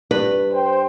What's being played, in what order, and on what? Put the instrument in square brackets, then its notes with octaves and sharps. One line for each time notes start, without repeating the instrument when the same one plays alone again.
[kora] G2 [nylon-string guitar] B4
[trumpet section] C5 G5